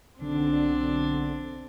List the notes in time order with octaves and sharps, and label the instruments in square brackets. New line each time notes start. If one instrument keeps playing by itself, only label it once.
[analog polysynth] B1 D3 [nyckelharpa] C4 D4